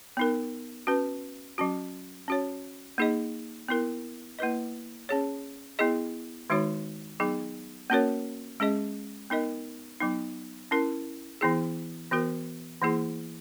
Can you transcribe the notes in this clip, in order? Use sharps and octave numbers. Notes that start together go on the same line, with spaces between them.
B3 D#4 A#4
C#4 F#4 B4
F#3 C#4 F#4
C#4 F#4 C#5
A#3 D#4 G#4 D#5
B3 E4 A#4
A#3 E4 B4 D#5
C#4 G#4 C#5
B3 E4 G#4 D#5
D#3 G#3 D#4 F#4 C#5
F#3 B3 D#4 G#4
A#3 C#4 F#4 A#4 C#5
G#3 C#4 G#4 D#5
B3 D#4 A#4 D#5
F#3 B3 D#4
C#4 E4 A#4
E3 B3 E4 G#4
E3 B3 F#4 A#4
E3 A#3 E4 G#4